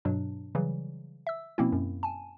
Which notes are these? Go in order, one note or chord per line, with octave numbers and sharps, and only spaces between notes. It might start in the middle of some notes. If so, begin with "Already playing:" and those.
G2 B2 F#3 D4
C#3 E3 F#3 G3
E5 E6
B2 F3 A#3 C4 C#4 E4
F#2
G#5 A5